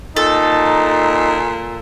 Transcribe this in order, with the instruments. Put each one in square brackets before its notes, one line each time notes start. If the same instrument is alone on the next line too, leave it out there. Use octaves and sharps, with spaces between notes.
[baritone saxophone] A#2 [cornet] D#4 [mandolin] A4